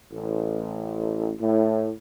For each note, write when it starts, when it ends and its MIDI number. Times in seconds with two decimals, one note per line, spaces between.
0.12 1.33 33
1.41 1.91 45